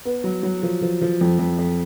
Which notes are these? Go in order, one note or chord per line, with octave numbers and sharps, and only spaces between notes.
B3
F#3
F#3
F3
F3
F3
F2
F2
F2